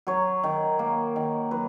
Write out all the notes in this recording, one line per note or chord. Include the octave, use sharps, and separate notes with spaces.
F#3 C#5
D#3
A#3
D#3
F#3 B4